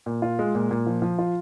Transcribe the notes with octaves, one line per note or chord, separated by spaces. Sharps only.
A#2
F4
G#3
A#2
A#2
F3
F3
F4